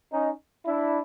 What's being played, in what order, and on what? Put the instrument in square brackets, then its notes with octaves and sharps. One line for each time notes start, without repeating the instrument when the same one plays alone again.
[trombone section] C#4 D#4
D4 E4